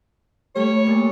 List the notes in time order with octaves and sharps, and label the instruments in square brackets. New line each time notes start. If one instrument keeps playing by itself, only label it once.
[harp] G3 A3 [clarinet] C#5
[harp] A#2 A5